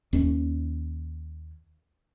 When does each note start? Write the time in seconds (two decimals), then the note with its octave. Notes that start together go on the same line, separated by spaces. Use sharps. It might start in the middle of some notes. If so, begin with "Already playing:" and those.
0.13 D#2 C#4